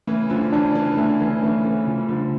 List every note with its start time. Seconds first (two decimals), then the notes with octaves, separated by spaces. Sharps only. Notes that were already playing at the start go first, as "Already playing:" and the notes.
0.07 C#3 E3 A3
0.30 D3 F3
0.52 C#3 E3 D4
0.75 C#3 E3
0.97 D3 A3
1.20 C#3 E3
1.42 C#3 E3 A3
1.64 C#3 E3
1.87 C#3 F3
1.98 G3
2.08 D3 F3